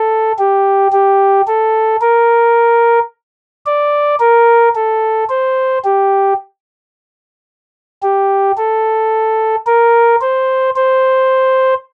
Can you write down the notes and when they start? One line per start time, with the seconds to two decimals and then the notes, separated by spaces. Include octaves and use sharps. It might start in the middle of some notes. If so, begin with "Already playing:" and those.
Already playing: A4
0.38 G4
0.92 G4
1.47 A4
2.01 A#4
3.66 D5
4.20 A#4
4.75 A4
5.29 C5
5.84 G4
8.03 G4
8.58 A4
9.67 A#4
10.21 C5
10.76 C5